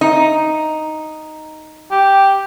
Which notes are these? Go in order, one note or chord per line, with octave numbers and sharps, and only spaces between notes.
D#4
G4